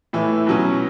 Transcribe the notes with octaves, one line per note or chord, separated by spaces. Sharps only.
A2 E3 A3
B2 F#3 C#4